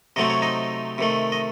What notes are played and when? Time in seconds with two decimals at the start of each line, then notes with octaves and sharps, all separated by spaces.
0.16 C3 F#3 A3 C4 D#5
0.30 C#5
0.42 D#4 D#5
0.98 C3 D#3 A3
1.32 D#5